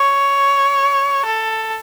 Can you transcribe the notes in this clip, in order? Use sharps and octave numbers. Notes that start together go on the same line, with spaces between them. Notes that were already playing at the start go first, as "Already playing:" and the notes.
Already playing: C#5
A4